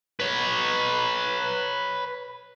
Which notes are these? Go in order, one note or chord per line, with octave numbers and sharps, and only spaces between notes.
B4 C#5